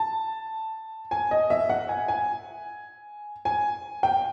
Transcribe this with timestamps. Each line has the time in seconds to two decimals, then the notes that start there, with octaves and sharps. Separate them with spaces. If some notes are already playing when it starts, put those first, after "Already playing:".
Already playing: A5
1.11 G#5
1.31 D#5
1.50 E5
1.70 F#5
1.89 G#5
2.08 G#5
3.45 G#5
4.03 G5